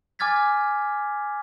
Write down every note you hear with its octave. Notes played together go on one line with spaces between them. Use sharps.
G#5 D6 F6 G#6 A6 B6